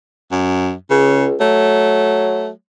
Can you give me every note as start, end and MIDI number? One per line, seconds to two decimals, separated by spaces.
0.31 0.73 42
0.90 1.35 37
0.90 1.25 49
1.40 2.51 54
1.40 2.49 57